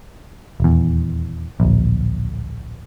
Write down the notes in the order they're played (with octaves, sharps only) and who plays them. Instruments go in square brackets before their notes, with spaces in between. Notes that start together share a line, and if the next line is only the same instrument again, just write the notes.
[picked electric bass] D#1 E2
D1 A#1